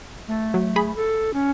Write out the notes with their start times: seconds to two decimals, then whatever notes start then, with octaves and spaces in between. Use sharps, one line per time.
0.28 A3
0.54 F#3
0.76 G#4 B5
0.96 A4
1.34 C#4